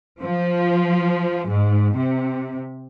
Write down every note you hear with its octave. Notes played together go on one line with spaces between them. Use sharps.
F3
G#2
C3